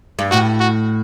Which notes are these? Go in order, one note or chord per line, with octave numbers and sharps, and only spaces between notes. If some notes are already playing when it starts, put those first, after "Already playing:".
G2
A2 F#4
F#4